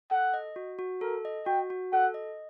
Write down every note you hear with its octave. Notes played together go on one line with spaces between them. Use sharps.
A4 F#5
D#5
F#4
F#4
A4 A#4
D#5
F#4 G5
F#4
A4 F#5
D#5